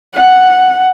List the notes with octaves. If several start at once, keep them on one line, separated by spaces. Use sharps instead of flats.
F#5